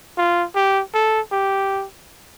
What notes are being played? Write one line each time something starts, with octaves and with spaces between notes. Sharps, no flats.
F4
G4
A4
G4